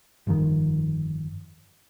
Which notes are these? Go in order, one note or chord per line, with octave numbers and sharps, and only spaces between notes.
G1 F2 D#3